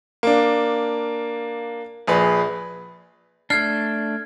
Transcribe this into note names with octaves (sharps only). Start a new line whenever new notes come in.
A#3 D4
A#1 G#4 B4
A3 D4 F6 G#6 C7